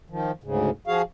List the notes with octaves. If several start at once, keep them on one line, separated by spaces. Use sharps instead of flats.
D#3 F3
D2 G#2 C#3
F3 F#4 G#4 F5